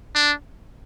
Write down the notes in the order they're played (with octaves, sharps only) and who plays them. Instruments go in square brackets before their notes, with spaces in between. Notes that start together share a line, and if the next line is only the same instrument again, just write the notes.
[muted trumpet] D4